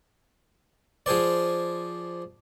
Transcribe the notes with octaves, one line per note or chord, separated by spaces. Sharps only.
F3 G#4 C5 D5